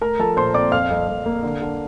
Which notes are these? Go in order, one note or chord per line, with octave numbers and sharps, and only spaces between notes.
A3 A#4 A#5
F3 A4 A5
A#2 C5 C6
C4 D5 D6
F2 F5 F6
F2
F2
A#3
D3
D3